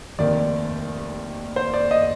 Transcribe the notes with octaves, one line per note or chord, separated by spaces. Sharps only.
F1 D#2 D#3 D5
C5
D5
D#5